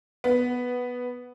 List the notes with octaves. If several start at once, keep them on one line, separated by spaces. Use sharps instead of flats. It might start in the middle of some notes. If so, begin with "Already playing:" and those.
B3